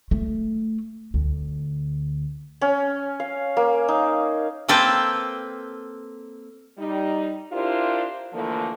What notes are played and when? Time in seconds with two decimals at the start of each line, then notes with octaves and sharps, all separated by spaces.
0.11 A3
1.14 D2
2.61 C#4
3.20 F5
3.57 A#3
3.88 D#4
4.69 A#3 C4 A4 B4 G5
6.78 G3 D#4
7.52 D4 E4 F4 G4 A#4 C5
8.33 D3 E3 F3 A3 A#3